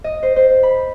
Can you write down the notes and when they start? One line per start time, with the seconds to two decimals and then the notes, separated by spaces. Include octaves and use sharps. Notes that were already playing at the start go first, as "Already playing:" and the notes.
0.04 D#5
0.23 C5
0.36 C5
0.63 B5